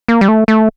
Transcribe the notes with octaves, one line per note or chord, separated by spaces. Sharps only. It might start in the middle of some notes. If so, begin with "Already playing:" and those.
A#3
G3
A3
A3